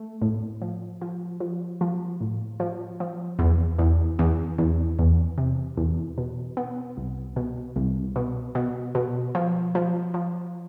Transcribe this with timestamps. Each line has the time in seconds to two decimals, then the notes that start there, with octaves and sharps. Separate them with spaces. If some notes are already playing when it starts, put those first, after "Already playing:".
Already playing: A3
0.22 A2
0.62 F3
1.01 F3
1.40 F3
1.81 F3
2.21 A2
2.60 F3
3.00 F3
3.39 E2
3.79 E2
4.19 E2
4.58 E2
4.99 E2
5.38 C3
5.77 E2
6.18 B2
6.57 B3
6.97 C2
7.36 B2
7.76 C2
8.16 B2
8.55 B2
8.95 B2
9.35 F3
9.75 F3
10.14 F3